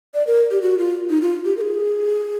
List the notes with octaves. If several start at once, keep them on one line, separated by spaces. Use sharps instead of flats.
D5
A#4
G4
F#4
F4
D#4
F4
G4
A#4
G#4